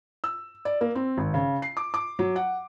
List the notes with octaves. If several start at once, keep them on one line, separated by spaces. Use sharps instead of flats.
E6
D5
A#3
C4
G#1
C#3
C7
D6
D6
F#3
F#5